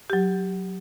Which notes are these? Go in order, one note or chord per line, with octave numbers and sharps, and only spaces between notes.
F#3 G4